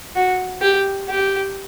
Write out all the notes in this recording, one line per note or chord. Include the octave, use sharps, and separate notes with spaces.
F#4
G4
G4